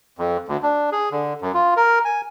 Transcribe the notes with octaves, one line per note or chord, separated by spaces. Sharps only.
F2
D2
D4
G#4
D3
F#2
F4
A#4
G#5